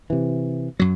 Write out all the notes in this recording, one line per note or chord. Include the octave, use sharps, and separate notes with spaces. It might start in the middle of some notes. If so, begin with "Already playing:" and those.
C3 E3
F#2 F#3